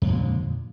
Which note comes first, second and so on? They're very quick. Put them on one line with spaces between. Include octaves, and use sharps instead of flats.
F2 G#3 A#2 D3